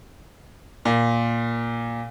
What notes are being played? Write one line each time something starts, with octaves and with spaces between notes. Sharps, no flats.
A#2